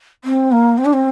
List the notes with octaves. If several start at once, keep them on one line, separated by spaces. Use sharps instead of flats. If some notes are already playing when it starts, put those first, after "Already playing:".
C4
A#3
C4
D4
C4